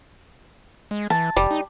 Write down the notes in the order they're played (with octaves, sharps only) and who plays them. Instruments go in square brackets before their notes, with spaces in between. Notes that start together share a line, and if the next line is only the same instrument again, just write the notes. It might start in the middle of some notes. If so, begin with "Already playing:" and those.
[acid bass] G#3
[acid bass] E3 [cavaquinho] A5
[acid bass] F1 [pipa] G3
[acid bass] D#4